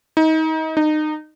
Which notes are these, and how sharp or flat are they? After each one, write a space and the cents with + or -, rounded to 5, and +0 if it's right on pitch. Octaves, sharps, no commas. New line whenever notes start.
D#4 +30
D#4 -25